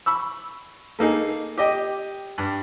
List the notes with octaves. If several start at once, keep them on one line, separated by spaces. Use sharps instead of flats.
B5 C#6 E6
A3 A#3 D#4 G#4
G4 D#5 G5
G2